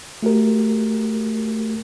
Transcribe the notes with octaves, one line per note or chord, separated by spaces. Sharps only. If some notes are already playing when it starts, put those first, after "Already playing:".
A3 F#4 G4 A#4